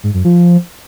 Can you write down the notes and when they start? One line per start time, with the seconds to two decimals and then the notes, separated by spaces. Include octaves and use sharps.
0.04 G#2
0.14 F#2
0.25 F3